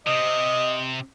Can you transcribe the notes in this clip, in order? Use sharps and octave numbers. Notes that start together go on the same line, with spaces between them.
C3 D#5